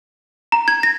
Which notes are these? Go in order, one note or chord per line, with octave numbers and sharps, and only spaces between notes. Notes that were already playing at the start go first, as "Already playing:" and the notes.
A#5
G#6
A#6